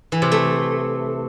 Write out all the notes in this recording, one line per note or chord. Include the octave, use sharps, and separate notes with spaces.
E3
C3
A3